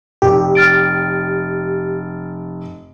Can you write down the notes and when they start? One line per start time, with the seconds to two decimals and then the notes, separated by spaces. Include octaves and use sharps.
0.22 F1 G4
0.55 F6 A6 D7